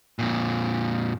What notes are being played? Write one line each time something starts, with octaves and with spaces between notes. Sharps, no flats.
F2 A#2